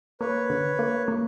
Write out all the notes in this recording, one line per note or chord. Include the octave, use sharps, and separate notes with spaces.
A#3 B4 C#5
D3
A#3
A#3